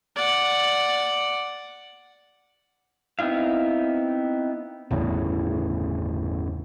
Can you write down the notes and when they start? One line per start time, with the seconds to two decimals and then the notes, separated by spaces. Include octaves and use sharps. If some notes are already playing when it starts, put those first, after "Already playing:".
0.16 D5 F#5
3.19 B3 C4 D#4 E4 F5
4.91 G1 E2 A2 C#3